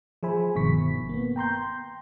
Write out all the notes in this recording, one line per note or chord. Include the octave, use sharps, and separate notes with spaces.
F3 G#4 C5 E5 G#5 B5
G1 G2 B2 D#3 C#6 B6
A#3 B3
G5 A#5 C6 G6